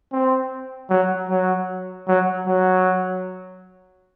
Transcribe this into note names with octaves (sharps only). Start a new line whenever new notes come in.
C4
F#3
F#3
F#3
F#3